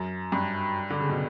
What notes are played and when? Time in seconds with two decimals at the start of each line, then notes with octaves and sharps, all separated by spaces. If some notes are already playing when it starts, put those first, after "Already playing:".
Already playing: F#2
0.32 G2
0.90 D3
1.00 C#3
1.09 B2